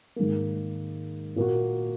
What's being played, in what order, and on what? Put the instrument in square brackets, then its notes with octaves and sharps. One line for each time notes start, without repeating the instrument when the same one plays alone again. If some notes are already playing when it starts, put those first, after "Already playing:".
[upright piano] G#2 D#3 A#3
A#2 A#3 F#4